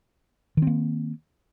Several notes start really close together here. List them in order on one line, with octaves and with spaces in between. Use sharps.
D#3 C4 A#3